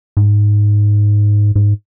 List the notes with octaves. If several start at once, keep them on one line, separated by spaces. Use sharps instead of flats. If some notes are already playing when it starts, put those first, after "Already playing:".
G#2
G#2